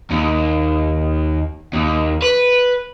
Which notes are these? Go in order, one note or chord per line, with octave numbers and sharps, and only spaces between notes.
D#2
D#2
B4